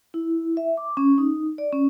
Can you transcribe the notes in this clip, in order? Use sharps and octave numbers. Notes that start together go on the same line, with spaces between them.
E4
E5
D6
C#4
D#4
D5
C#4